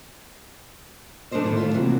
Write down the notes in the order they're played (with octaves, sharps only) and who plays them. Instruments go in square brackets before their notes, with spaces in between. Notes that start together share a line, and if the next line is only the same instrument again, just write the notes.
[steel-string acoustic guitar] A3 D4 A#4 C5 D#5
A2 D#3 A#3 E4
D#2 A2 F4 E5
C3 E3 A#3 F#4